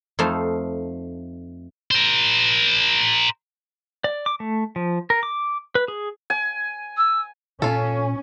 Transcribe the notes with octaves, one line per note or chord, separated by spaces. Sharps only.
F2 A3 D#4 C5 F5
A#4 C5
D5
D6
A3
F3
A#4
D6
B4
G#4
G#5
E6
A#2 C#4 F4 A4